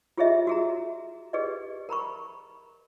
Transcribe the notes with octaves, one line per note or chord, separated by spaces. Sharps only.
F4 G4 G#4 C#5 D#5 E5
F#4 G#4 A#5
G4 G#4 B4 D5 D#5
A#4 A#5 B5 C#6